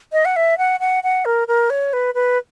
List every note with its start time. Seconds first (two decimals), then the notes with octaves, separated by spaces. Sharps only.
0.12 D#5
0.25 F#5
0.36 E5
0.58 F#5
0.80 F#5
1.03 F#5
1.25 A#4
1.48 A#4
1.70 C#5
1.93 B4
2.14 B4